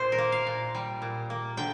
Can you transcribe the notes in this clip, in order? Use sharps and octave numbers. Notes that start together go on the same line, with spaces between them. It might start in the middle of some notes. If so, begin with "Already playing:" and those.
Already playing: A#2 C5
A#4
A#3
F5
A#2
G3
A#2
A#3
D3 G5